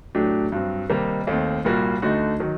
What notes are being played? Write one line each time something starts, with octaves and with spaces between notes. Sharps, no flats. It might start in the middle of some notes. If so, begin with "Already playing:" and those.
A2 F#3 A3 D4 G4
G2 F#3 C4
C3 D#3 G3 A#3 D#4
D#2 D#3 A3 C4
C2 A#2 G3 A#3 F#4
D2 D3 A3 D#4 F#4
D#3 F#3